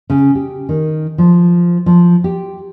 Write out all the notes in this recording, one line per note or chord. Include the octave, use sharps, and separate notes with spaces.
C#3
G4
D#3
F3
F3
G4